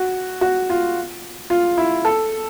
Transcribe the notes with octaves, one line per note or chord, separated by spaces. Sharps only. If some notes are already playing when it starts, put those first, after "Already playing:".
Already playing: F#4
F#4
F4
F4
E4
A4